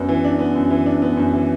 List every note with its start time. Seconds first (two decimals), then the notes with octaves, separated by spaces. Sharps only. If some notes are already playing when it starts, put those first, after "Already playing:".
Already playing: F#2 B3 D4
0.09 E3
0.24 D4
0.39 B3
0.55 F#2
0.70 E3
0.86 D4
1.02 B3
1.17 F#2
1.33 E3